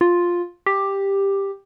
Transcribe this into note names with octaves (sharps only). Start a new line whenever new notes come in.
F4
G4